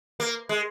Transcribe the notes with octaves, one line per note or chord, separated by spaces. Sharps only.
A#3
G#3